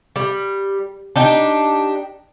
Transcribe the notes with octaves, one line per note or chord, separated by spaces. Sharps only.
G3
D4 D#4 G4